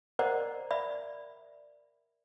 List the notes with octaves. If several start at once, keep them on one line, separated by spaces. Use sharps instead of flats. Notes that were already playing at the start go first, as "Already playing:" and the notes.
A#4 C5 D5 D#5 F#5 A#5
D5 E5 B5